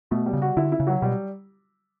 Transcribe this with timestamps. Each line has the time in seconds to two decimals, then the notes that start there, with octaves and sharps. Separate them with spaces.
0.11 B2 A3
0.26 G3
0.33 C#3
0.42 F#4
0.57 D3 E4
0.72 E4
0.80 C#3
0.87 F#3
1.02 B2 G3